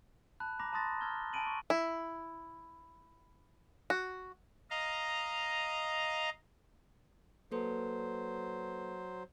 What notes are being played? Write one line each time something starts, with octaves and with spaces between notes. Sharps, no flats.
A5 B5 F#6
A#5 B5 D6 A#6
A5 B5 C6 D#6 A6 A#6
A#5 E6 F6 G#6 G7
G#5 A5 B5 D7 D#7 F#7
C#6
E4
F#4
D#5 F5 A#5
F#3 A#3 A4 B4 C5